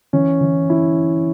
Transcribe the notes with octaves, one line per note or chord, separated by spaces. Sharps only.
E3 C#4
E3
E4